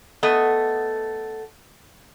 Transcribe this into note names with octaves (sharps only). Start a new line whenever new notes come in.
A3 B3 D#5